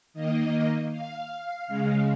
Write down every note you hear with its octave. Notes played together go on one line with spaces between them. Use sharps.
D#3 A#3 D#5
F5
C#3 G#3